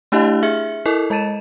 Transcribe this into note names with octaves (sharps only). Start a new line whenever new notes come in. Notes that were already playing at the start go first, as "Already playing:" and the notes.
A3 D4 E4 G4 D#5 F5
G#4 E5 F6 C#7
E4 A4 A#4 D#5
G#3 D#5 A5 A6 D#7 E7